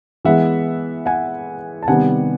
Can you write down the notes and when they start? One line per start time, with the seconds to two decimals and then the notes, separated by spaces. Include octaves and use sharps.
0.25 E3 G#3 B3 E5 F#5
1.06 F#5 G#5
1.83 A5
1.87 C3 D#3 G3 B3 F#5 G#5